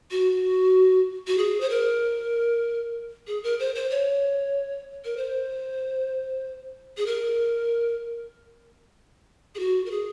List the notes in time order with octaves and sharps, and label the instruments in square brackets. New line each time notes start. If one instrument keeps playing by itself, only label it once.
[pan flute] F#4
F#4
G#4
C5
A#4
G#4
A#4
C5
C5
C#5
A#4
C5
G#4
A#4
G#4
F#4
A#4
G#4